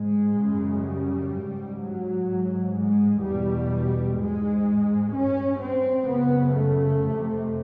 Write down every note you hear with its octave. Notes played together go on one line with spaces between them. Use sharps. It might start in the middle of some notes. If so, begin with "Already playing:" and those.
Already playing: G#2 G#3
C#3
F#2
G3
G#2
F#3
G#2
G#3
E2 B2 G3
G#2 G#3
G2 C#4
C4
F#2 C#3 B3
A3
F2 C3